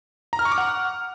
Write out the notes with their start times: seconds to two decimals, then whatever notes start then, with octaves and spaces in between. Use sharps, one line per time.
0.33 A#5
0.39 F6
0.45 C#6
0.52 D6
0.58 F#5